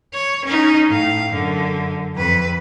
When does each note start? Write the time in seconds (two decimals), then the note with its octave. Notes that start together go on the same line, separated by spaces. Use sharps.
0.13 C#5
0.44 C#4 D#4
0.88 A2 F5
1.31 F#2 D3
2.15 F2 B4